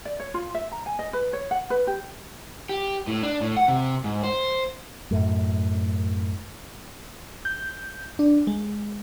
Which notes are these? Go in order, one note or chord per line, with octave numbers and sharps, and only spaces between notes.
D5
C#5
F4
E5
A#5
G#5
D#5
B4
C#5
F#5
B4
G4
G4
A2
D4
A2
F#5
C3
G#2
C5
F#2 A2
G6
D4
G#3